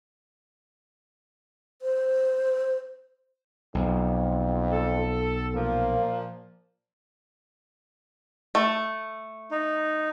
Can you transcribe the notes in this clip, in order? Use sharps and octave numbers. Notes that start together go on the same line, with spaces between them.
C5
B1 F2
A4
A#2 F3 A#3
A3
D#4